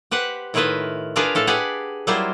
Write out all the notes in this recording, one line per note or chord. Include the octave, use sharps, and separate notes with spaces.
G4 B4 C5 F#5
A2 D#3 E4 F4 B4 D#5
D4 F4 G#4 A#4 B4 F5
A2 A4 F5 A5
G4 G#4 B4 D5 F#5
F#3 G3 A#3 E4 F4 C5